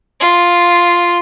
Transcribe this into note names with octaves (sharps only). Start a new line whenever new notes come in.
F4